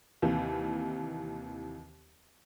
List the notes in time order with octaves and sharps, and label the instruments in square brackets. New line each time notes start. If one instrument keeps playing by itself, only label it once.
[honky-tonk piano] D#2 C3 E3